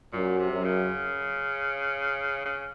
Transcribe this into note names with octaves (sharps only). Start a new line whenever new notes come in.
F#2 A#2
C3
F#2
C#3
C#3